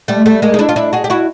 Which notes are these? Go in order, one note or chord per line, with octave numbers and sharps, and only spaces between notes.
G3 A3
G3 A3
G#3 A#3
D#4
D4 E4
F4
D4 E4
F#4 G#4
G4
E4 F#4